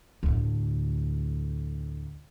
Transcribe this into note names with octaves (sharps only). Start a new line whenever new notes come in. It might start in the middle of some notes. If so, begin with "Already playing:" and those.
D2 A2